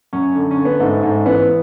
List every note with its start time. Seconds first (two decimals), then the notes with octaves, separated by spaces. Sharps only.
0.13 F#2 C#4
0.35 D3
0.51 C#4
0.58 D3
0.65 B3
0.80 G#2 A3
1.03 G#2
1.26 E3 B3